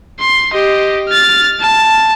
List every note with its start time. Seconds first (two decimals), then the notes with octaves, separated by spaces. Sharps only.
0.20 C6
0.53 G4 D#5
1.09 F6 A6
1.60 A5